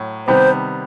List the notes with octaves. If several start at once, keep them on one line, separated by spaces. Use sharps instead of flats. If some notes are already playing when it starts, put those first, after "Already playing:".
Already playing: A2 F#3
C3 D#3 G3 B3 C5